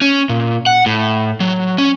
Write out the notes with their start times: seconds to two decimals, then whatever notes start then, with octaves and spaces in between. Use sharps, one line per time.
0.01 C#4
0.29 A#2
0.66 F#5
0.86 A2
1.40 F#3
1.78 C#4